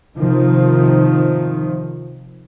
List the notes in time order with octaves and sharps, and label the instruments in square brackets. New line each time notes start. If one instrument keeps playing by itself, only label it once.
[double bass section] C3 D#3 F3